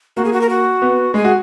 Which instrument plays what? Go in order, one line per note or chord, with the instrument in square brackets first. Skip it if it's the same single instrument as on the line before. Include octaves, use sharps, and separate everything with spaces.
[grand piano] A#3 [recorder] F#4
[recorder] G#4
F#4
A#4
F#4
[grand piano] B3
[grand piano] G#3 [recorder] G#4
[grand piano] F#4